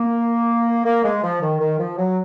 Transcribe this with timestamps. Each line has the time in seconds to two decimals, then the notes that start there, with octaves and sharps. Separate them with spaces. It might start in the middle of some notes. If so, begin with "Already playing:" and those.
Already playing: A#3
0.85 A#3
1.04 G#3
1.23 F3
1.42 D#3
1.60 D#3
1.79 F3
1.98 F#3